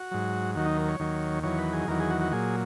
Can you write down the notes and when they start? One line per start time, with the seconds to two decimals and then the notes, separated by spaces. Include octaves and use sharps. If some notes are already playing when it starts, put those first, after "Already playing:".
Already playing: F#4
0.11 G#2 F#3
0.55 D#2 D#3 F#3 F#4
0.66 D#4
0.78 A#4
0.88 C#5
0.99 D#2 D#3 F#3
1.43 E2 D#3 F#3 C#5
1.58 B4
1.73 G#4
1.88 E2 D#3 F#3 A#4
2.00 G#4
2.10 F#4
2.21 F#4
2.32 A#2 F#3 G#4